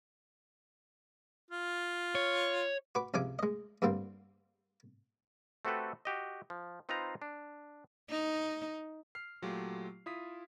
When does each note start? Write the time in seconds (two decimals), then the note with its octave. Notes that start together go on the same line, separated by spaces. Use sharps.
1.50 F4
2.15 C#5
2.95 F#4 B4 D6
3.14 C#2 C3 F3 G#5 D6
3.39 G#3 D#5
3.82 G2 D3 G3 A#3 C4
5.65 A3 C4 F#4 G4 A4 B4
6.05 F#4 G4 D#5
6.50 F3
6.89 C4 D#4 F4 B4 C5 A#5
7.22 D4
8.09 D#4
9.15 F6 C7
9.42 A#2 F#3 A3 F4 G4
10.06 E4 F4 D#6 B6